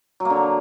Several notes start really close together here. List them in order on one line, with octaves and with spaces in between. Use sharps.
F#3 A#3 D3